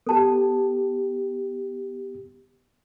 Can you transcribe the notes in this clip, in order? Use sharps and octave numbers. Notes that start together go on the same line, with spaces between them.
B3 G4 A4 A5